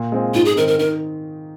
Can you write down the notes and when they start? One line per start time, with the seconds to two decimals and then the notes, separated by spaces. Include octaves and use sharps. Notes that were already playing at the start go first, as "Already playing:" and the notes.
Already playing: A#2
0.12 G#3 C4 F4
0.34 G#2 F4
0.45 G#4
0.57 D#3 C4 D#4 A#4
0.68 A#4
0.79 D#3 A#4